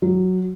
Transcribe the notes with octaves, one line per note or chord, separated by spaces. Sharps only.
F#3